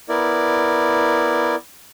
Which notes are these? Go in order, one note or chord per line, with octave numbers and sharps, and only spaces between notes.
B3 E4 A#4 D5